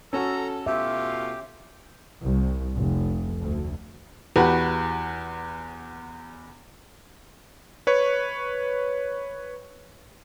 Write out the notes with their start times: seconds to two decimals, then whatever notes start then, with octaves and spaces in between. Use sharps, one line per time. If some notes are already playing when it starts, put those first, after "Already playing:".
0.13 C#4 F#4 A4 A#5
0.67 B2 A3 F4 G4 E5
2.23 C2
2.74 F1
3.39 D2
4.36 E2 F#4 G4 B4
7.87 B4 C#5 C#6